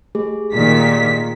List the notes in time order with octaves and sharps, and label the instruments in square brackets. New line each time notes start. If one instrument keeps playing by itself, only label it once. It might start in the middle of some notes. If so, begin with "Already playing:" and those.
[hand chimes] A3 G4 G#4
[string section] A#2 D#3 B6